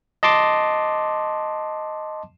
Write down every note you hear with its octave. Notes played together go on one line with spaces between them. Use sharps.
D#5 A5 C6 D6